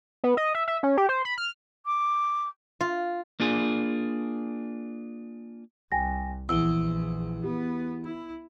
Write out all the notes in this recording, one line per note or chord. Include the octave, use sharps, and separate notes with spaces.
B3
D#5
E5
E5
C#4
G4
C5
B5
F6
D6
F4
A#3 D4 F4 G#4
C2 G5 G#5 A#6
A#1 E2 E6 G7
B3 G4
E4